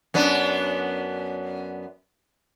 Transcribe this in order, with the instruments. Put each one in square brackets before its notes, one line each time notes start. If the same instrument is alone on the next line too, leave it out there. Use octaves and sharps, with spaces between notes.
[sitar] F#2 B3 D4